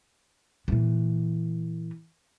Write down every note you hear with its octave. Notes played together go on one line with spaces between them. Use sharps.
A#2 E3